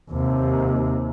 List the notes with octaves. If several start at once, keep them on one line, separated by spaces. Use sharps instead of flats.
D#2 C3